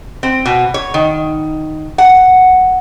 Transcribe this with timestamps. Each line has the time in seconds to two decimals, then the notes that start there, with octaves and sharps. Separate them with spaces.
0.23 C4
0.46 B2
0.74 C#5
0.94 D#3
1.98 F#5